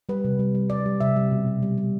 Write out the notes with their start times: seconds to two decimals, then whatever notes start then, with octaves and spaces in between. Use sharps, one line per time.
0.09 G3 B4
0.24 C3
0.39 G3
0.55 G3
0.70 G3 D5
0.86 G3
1.00 C3 E5
1.16 G3
1.31 B2
1.47 B2
1.63 G3
1.78 G3